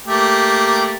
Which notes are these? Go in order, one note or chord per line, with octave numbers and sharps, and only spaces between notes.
A3 A#3 G4